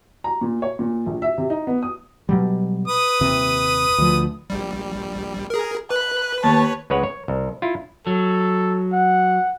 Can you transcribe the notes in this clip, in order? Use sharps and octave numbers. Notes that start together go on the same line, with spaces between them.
A#5
A#2
C#5
A#2
A#1
E5
C3
D#4
B3
D#6
B2 F#3 G3
B4 D#6
D#1 C3
D2 F3
A#1 G3
G#4 A#4
B4 F#6
D#2 C#5 A5
C#2 G#3 B4 C#5 F#5
C#5
C2
E4 F4
F#3 A4
F#5